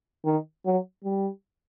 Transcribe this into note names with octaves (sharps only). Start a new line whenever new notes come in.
D#3
F#3
G3